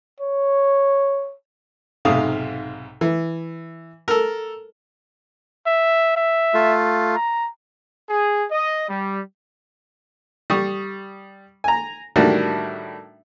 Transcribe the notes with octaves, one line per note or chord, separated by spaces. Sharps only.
C#5
B1 G#2 C3 F5 D#6
E3
A4 A#4
E5
E5
A3 F4
A#5
G#4
D#5
G3
G3 C#6 D#6
G#5 A#5
A2 D#3 G3 D4 F#4